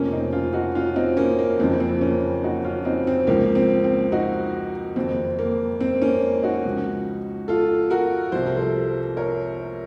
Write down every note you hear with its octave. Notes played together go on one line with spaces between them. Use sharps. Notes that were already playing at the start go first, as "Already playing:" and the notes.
Already playing: F1 F2 C#3 F3 A#3 C#4
C4 D#4
C#4 F4
D#4 F#4
C#4 F4
C4 D#4
A#3 C#4
A#3
F#1 F2 C#3 F3 C4
C4
A#3 C#4
D#4 F#4
C#4 F4
C4 D#4
C4
C#2 C#3 F3 A#3
C4
C4
D#4 F#4
F#1 F2 D#3 C4
A#3
C4
A#3 C#4
D#4 F#4
C#2 C#3 F3
F4 A4
F#4 A#4
C2 C3 F3 C5
A#4
A4 C5
A#4 C#5